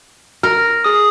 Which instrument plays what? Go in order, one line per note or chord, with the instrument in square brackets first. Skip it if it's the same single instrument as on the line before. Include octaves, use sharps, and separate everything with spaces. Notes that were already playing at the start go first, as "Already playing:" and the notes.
[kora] A#4 [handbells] F6
[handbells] G#4 D#6